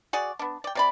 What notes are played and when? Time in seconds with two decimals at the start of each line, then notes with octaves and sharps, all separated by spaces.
0.13 F#4 G#4 D5
0.39 B3 D4
0.64 D5 G5
0.75 C3 D5 B5